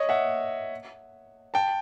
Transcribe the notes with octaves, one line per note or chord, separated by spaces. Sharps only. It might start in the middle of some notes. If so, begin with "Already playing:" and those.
Already playing: C#5 D#5
E5 F#5
G5 A5